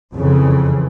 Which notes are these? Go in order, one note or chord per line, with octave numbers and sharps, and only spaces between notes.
F2 C#3 E3